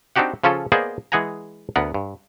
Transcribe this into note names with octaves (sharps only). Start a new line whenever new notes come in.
C4 D4 D#4 F#4 G4 F#5
C#3 F3 C#4 F4 A4
A#3 B3 G#4 C5 D5 D#5
E3 G#3 G#4 F#5 G#5 A#5
D2 B3 A#4 F#5
G2